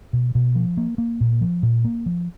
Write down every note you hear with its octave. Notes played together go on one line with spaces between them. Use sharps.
B2
B2
F3
A#3
A#3
A#2
F3
A#2
A#3
F3